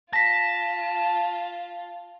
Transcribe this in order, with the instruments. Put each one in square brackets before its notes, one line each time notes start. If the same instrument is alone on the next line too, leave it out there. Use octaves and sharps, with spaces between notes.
[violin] F4 [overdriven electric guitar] A5 [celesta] A#6 B6